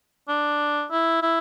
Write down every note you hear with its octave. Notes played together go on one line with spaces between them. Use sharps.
D4
E4
E4